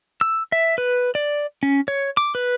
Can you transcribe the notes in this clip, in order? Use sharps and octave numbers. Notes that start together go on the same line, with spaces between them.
E6
E5
B4
D5
C#4
C#5
D6
B4